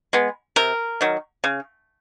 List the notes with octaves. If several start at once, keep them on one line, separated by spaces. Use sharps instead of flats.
G#3 B3
C3 A#4
D#3 F#3
C#3